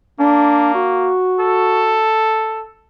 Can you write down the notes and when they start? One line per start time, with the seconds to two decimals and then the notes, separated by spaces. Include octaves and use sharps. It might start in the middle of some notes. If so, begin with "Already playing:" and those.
0.20 A#3 D4
0.75 F#4
1.40 A4